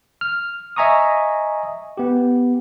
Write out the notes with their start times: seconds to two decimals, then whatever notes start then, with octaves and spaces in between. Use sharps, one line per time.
0.21 F6
0.76 D#5 E5 G#5 A#5 C#6 D#6
1.97 B3 G4